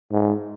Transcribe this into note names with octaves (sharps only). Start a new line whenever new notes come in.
G#2